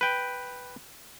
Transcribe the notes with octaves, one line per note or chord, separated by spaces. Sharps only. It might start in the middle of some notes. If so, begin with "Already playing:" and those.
B4 G5